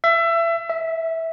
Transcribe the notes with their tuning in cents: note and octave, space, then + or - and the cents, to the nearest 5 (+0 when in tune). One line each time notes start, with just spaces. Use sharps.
E5 +25
E5 -15